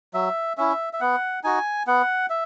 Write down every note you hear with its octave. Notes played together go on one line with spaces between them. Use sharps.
F#3 E5
C#4 E4 E5
E5
B3 F#5
D#4 F#4 G#5
B3 F#5
E5